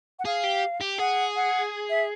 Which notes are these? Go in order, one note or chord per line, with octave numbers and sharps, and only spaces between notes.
F#5
G#4 F5
G4
G4
G#4 F#5
F#5
E5